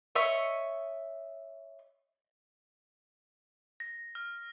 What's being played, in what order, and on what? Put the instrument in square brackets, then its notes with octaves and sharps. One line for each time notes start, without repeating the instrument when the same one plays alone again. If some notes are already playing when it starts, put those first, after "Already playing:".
[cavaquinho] C#5 D#5 E5 C#6
[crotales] A#6
F6